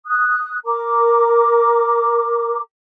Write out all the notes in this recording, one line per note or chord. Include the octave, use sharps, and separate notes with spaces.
D#6 F#6
A#4 A#5 D6